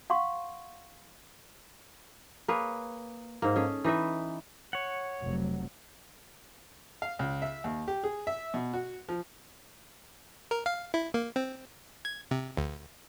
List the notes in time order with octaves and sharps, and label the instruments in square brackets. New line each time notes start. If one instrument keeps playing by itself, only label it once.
[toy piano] F5 F#5 C6 C#6
[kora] A#3 G#4 B4 C#5
G#2 A#3
C#4 G#4 A4
E3 D#4 B4 E5
[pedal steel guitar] C#5 F#5
[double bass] F1 F#3
[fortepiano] F5
C#2
E5
D#2
G4
G#4
E5
B2
F#4
F3
[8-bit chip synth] A#4
F5
E4
A#3
C4
G#6
C3
D2